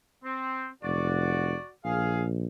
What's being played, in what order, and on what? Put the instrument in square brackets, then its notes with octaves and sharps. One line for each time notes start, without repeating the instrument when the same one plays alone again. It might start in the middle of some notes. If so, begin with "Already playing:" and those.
[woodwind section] C4
[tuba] F1 [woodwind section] F#4 D5
[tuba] A#1 [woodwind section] G#4 F5